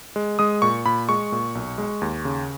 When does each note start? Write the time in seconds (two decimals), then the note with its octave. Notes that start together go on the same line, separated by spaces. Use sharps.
0.16 G#3
0.39 G#3 D#6
0.62 A#2 C#6
0.85 A#2 B5
1.09 G#3 C#6
1.32 A#2
1.55 B1
1.78 G#3
2.01 D#2
2.25 C#3